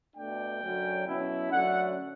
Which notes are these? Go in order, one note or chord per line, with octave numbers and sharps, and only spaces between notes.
B2 A3 D4 G5
F#2 D3 F#3 C#4
B2 F#3 C#4 E4
F#2 D3 F#3 A3 C#4 F#5